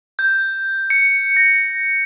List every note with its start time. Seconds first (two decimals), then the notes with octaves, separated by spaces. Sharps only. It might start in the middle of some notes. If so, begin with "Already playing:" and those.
0.19 G6
0.90 C#7
1.37 A#6